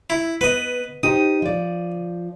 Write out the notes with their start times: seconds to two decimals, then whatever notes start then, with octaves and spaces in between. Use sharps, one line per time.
0.10 E4
0.41 B3 B4 D#5
1.03 D#4 G4 C5 D#6
1.42 F3 D5